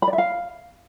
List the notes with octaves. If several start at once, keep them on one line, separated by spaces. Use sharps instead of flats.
B5
D5
E5
F5